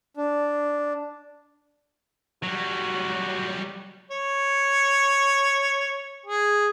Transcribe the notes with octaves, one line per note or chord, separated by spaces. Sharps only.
D4
F#3 G3 F#4
C#5
G#4